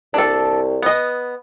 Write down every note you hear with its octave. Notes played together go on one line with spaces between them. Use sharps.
C2 D4 A4
B3 D#5